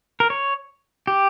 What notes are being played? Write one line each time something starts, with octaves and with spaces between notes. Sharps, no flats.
A#4
C#5
G4